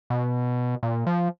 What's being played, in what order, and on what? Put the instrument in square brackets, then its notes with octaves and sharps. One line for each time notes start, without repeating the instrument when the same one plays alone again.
[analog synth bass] B2
A#2
F3